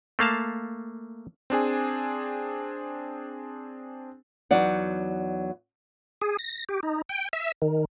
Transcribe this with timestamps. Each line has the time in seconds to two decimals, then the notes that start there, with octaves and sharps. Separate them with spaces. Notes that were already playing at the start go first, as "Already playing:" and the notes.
0.19 A3 A#3 F5 A5
1.50 C4 D4 G#4 G#5
4.51 E2 F#3 D#4 D5 F#5
6.21 G#4
6.39 A#6
6.69 G4
6.83 D#4
7.09 G5
7.33 E5
7.62 D#3